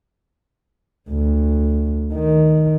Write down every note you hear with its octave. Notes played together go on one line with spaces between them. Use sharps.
D2
D#3